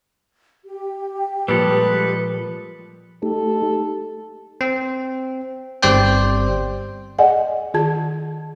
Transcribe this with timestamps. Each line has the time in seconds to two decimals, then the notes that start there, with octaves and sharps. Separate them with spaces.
0.64 G4
1.48 A#2 F3 G3 G#3 A4 B4
3.23 A3 D#4 G4 A4
4.61 C4
5.83 G1 G3 C4 C5 D5 G5
7.19 G#4 D5 D#5 F#5 G#5
7.74 D#3 F4 G#4 A5 G#6